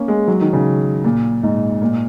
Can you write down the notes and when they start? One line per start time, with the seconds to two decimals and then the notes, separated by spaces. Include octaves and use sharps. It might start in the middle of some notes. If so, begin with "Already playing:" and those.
Already playing: A#3 C#4
0.08 G#3
0.28 F#3
0.41 D#3
0.53 C#3
1.04 A#2
1.43 G#2
1.82 A#2